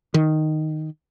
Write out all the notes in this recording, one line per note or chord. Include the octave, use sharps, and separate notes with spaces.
D#3